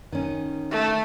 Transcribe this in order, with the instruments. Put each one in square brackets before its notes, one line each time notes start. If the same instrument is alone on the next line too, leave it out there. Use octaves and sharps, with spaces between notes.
[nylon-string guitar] D#3 C#4
[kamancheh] A3